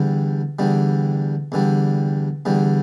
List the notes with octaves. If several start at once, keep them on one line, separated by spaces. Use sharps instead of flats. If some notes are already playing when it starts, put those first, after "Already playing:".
Already playing: E2 D3 G3
E2 D3 G3
E2 D3 G3
E2 D3 G3